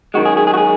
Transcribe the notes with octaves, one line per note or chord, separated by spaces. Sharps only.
F#2 D#3 G#3 F#4
G#4
G#4
G#4
F#4
G#4